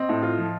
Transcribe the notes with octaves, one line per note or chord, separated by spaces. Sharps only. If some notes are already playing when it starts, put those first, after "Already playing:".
Already playing: C4 D#5
A2
F4
F3